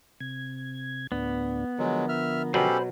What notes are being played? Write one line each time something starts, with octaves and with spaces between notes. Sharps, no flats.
C3 G#6
D2 A2 B3 D4
D3 F3 F#3 G#3 A#4
E5 F6
B2 F#3 C#4 G4 A4 C5 B5